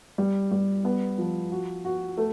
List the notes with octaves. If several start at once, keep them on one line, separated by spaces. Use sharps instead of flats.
G3
G3
B3
F3
F#4
F#4
A3